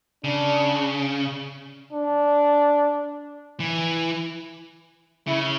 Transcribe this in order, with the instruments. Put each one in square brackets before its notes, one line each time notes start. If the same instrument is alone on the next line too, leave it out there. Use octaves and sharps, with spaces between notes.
[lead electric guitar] C#3 [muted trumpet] D4
[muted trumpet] D4
[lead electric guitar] E3
[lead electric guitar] C#3 [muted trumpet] E4